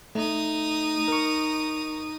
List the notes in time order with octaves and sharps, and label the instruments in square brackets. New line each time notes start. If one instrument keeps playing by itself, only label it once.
[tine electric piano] A3 [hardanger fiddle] D#4 D#6
[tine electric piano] A#4 C#6